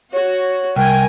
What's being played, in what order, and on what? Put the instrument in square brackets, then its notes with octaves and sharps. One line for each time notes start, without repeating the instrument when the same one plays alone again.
[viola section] F#4 [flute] C#5
[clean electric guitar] C2 [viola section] D#3 A#4 G#5 [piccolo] G5